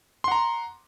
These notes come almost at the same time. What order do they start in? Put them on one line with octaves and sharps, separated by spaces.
C6 F#5 A#5